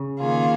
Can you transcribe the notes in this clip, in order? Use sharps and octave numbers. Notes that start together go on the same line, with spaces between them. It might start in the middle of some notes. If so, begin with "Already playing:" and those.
Already playing: C#3
D#3 A#3 F4 G#4